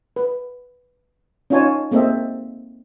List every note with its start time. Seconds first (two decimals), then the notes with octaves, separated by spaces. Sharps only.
0.16 B4
1.50 C#4 D#4 F4 C#5 G#5 A5
1.91 G#3 A#3 C4 A4 D#5 E5